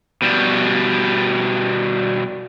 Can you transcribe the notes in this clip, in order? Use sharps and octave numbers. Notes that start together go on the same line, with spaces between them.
B2 G3